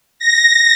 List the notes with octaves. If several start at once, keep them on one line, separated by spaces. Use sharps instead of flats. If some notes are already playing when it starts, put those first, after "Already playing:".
A#6